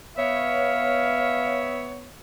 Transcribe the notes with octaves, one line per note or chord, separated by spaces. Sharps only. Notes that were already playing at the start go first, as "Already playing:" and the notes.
B3 C#5 E5 F5